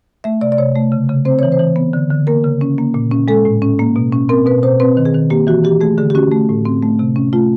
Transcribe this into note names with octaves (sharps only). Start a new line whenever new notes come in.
A3 E5
C3 D5
D5
C3 C#5
A3
C#3
C#3
C4 C5
E3 C#5
C5
E3
B3
D3
D3
A#3 A#4
C#3
C#4
A#3
A#2
C#4
G#3 A4
A2
C#4
A#3
B2
C#4
C4 A#4
B2 B4
B2 C5
C4 B4
D#3
G#4
D#3
A#3 G4
E3 F#4
E3 G4
A3 G#4
D3 G#4
G4
C#4 F#4
A3
A2
C4
A3
C3
C#4
A3 F4